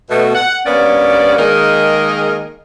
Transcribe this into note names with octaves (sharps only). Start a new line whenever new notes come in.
B2 A3
F#5
G2 A#3 B3 C#4 D5
D#3 G#3 A#3 G#4 A#4 D#5